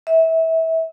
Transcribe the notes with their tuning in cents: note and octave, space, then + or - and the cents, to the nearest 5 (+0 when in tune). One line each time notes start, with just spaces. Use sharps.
E5 -25